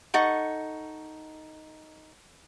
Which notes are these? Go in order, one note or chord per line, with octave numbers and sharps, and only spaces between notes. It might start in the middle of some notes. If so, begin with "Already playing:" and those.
D#4 A4 F#5 C#6